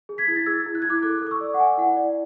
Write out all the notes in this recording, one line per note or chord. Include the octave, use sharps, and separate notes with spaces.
G#4
G#6 B6
E4
A6
G#4 E6 G#6
E4
F#6
G#6
E4
D6 F#6
A4 D6 F#6
A4 D6
C#6 E6
D5
F#5
D5 G#5
E4 F#5
D5